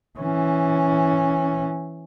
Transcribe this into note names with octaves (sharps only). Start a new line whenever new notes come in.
E3 C#4